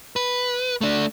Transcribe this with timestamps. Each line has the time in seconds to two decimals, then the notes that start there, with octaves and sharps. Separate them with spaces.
0.16 B4
0.81 A3 D4